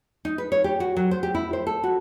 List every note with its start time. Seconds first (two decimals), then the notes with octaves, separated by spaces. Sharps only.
0.25 D#4
0.38 B4
0.52 C#5
0.64 G4
0.80 F#4
0.97 F#3
1.11 C5
1.23 G4
1.35 E4
1.53 C5
1.67 A4
1.84 F#4